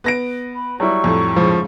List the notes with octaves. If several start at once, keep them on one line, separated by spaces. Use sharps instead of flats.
B3 A#6 D7
B5
F#3 G3 E4 C#6
F2 A2
G#2 C#3 F3